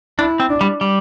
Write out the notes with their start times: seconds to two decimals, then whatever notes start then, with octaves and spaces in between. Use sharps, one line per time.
0.18 D4 E4
0.40 C4
0.49 D4
0.61 G3
0.81 G3